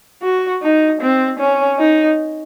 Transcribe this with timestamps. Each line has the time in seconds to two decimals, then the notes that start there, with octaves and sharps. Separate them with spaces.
0.23 F#4
0.62 D#4
1.01 C4
1.39 C#4
1.79 D#4